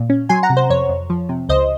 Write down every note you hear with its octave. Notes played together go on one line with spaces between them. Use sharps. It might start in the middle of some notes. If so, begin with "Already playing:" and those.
Already playing: A#2
C#4
F#3 G#5 C6
F#5 A#5
C3
C5
F2 C#5
F2
F3
C3
C#2 C5 D#5